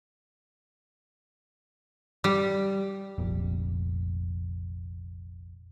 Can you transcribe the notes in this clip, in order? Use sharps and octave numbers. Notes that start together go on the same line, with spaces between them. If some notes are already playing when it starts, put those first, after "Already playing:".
G3
F1 A#1 F2